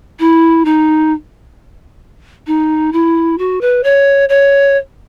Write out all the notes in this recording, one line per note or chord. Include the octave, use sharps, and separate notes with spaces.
E4
D#4
D#4
E4
F#4
B4
C#5
C#5